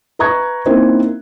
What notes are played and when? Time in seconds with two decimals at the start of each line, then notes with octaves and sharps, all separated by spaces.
0.19 B4 E5 A#5 C#6 F#6 G#6
0.66 A#3 C4 C#4 D#4 E4 C5